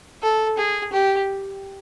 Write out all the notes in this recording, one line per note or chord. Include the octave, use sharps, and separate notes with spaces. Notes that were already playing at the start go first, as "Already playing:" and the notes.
A4
G#4
G4